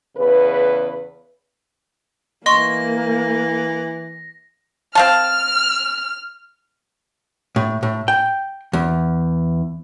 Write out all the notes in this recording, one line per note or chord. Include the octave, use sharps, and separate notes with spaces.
E2 C#3 B4
E3 A#3 D#5 C6 C#6 A#6
C4 F5 A5 F6
A2
A2
G5
E2